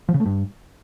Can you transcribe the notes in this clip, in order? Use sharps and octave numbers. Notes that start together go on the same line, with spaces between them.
F3
C#3
A3
G2